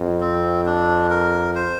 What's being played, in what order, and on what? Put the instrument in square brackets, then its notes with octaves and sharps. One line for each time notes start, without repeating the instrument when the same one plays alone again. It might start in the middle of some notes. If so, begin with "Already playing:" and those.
Already playing: [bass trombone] F2
[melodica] C4
D4
A#4
C5